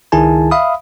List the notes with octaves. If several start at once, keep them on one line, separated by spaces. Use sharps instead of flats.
C#2 D#3 E4 G#4 G#5 A5
E5 F5 B5 D#6